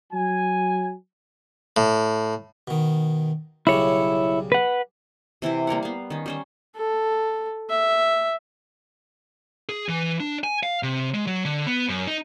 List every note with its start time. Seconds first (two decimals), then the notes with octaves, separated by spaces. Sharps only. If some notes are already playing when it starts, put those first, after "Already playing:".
0.13 F#3 G#5
1.77 A2
2.68 B2 D#3
3.67 B1 C#3 G3 E4 C#5
4.52 B4 F#5
5.42 C3 E3 E4 C5
5.67 G3 A#3 A#4 F#5
5.83 B3 F5
6.10 D#3 C#4
6.26 G3 C#4 C5
6.76 A4
7.70 E5
9.69 G#4
9.89 E3
10.20 D4
10.44 G#5
10.63 F5
10.83 C3
11.14 G#3
11.27 F#3
11.45 D3
11.66 B3
11.89 F#2
12.08 D#4